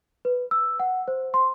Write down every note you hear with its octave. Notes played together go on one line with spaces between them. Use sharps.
B4
E6
F#5
C5
C6